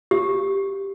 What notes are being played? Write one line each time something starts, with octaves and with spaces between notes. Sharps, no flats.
G4